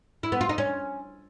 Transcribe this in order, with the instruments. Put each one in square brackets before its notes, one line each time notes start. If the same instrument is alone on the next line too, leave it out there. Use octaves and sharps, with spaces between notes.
[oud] E4
B3
F4
D#4
C#4